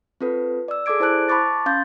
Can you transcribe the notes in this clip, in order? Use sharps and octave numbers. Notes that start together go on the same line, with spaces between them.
C4 F4 A4 B4
D5 E6
G#4 A4 D5 D6 G#6 D7
E4 C5 A5 F#6 D7
A5 B5 C#6 D6 A6
C#4 F5 C6 G6 A6